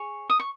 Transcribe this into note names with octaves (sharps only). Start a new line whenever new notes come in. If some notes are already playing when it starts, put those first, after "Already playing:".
Already playing: G#4 C#5 C#6
D#6
C#6